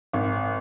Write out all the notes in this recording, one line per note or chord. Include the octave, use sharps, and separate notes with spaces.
G#1